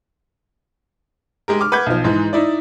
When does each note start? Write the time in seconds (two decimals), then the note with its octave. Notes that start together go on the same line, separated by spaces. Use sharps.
1.48 G#3 G4 A#4
1.61 D6 F6
1.72 B4 F#5 D6 G6 G#6
1.86 B1 F3
2.04 G#2 E3 G#3
2.33 D#4 E4 D5